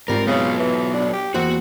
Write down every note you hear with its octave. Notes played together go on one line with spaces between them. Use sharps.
G#2 G3 C4 F4 A#4
C#3 F#3 B3
E3
D4
G4
E2 A#3 C4 F#4 F#5